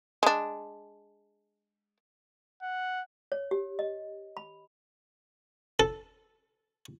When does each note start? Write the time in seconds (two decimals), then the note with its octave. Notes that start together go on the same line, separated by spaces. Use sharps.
0.23 G#3 D4
2.62 F#5
3.32 C#5
3.51 G4
3.79 D#5
4.37 B5
5.80 A4